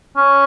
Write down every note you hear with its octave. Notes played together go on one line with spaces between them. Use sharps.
C#4